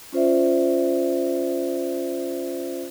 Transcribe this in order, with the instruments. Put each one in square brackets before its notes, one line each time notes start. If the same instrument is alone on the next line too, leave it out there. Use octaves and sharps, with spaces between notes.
[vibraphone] C#4 F4 C5 D5 E5